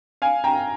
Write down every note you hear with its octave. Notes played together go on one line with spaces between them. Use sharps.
F5 G#5
G5 A#5